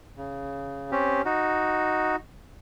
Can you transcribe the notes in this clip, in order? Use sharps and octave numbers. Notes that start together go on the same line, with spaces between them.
C#3
C4 C#4 G4
D#4 F#4